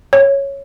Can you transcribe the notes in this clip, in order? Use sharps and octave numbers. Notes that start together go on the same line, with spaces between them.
C#5